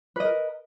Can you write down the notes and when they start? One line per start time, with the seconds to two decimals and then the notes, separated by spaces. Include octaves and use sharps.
0.16 B4
0.20 D#5
0.24 A#4